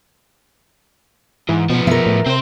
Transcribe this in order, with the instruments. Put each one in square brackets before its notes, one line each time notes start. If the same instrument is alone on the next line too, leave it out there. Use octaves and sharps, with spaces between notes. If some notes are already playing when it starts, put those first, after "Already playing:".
[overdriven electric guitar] G#2 [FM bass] E3
[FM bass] B2 [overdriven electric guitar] F3 B3
[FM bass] B2 [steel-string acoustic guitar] A#4 E5
[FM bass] A2
[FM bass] C3 [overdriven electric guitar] C4 C5